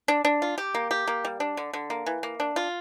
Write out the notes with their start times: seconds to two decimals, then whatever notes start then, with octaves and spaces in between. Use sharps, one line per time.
0.08 D4
0.25 D4
0.42 F4
0.58 G4
0.75 A#3
0.91 G4
1.08 A#3
1.25 G3
1.40 D4
1.57 D3
1.73 D3
1.90 A#3
2.06 E3
2.23 A#3
2.40 D4
2.56 F4